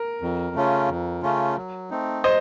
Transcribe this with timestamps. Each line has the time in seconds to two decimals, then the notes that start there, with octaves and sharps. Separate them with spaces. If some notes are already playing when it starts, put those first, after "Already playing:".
Already playing: A#4
0.21 F2
0.56 C#3 A3 C#4 F4
0.88 F2
1.22 C#3 A3 C#4 F4
1.57 F#3
1.90 A3 C4 D#4
2.23 F#3 C5 D#5